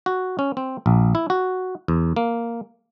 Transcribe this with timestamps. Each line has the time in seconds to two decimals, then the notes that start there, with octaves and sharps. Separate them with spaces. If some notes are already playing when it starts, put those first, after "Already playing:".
0.06 F#4
0.39 C#4
0.57 C4
0.86 A#1
1.15 E4
1.30 F#4
1.88 E2
2.16 A#3